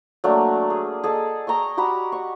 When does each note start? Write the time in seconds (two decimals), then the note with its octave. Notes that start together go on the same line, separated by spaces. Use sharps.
0.24 F#3 A3 A#3 D4
0.70 G#4
1.04 G#4 A4 D#5
1.47 C#5 G5 A#5 C#6
1.77 F#4 G4 A#5 B5
2.12 C#6